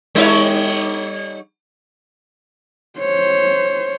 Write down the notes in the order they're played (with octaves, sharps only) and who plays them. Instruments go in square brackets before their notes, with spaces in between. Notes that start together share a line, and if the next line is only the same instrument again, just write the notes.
[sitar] G3 D#4 C#5
[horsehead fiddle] C5 C#5